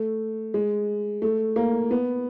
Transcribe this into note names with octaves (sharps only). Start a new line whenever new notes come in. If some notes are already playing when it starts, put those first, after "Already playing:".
Already playing: A3
G#3
A3
A#3
B3